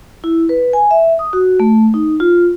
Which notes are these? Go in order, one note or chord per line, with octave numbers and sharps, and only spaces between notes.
E4
B4
G#5
E5
D#6
F#4
A3
D#4
F4